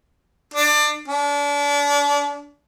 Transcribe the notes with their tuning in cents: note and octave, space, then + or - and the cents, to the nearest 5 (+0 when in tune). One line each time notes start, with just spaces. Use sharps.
D4 +25
D4 -35